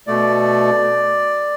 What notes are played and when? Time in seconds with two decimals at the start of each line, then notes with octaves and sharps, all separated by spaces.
0.07 B2 A3 D5